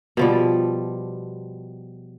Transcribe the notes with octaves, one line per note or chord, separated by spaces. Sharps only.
B2 F3 G3